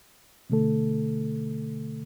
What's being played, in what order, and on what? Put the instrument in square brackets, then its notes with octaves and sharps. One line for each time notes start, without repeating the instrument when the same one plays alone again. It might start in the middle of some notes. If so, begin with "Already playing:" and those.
[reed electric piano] B2 D3 A3 A4